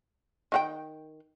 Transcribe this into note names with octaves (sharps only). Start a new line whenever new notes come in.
D#3 F#4 G5